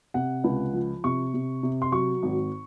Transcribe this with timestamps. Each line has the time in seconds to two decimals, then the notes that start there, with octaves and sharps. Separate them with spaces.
0.14 C3 F#5
0.44 C#2
0.74 F3
1.04 C3 C#6
1.34 C3
1.63 C3
1.82 C6
1.92 F#3 C#6
2.23 G#1